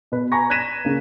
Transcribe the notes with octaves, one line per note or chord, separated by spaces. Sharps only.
B2 B4
G#5 A#5 B5 C#6 A#6
F#6 G#6 A#6 B6 D#7 E7
C#3 A#3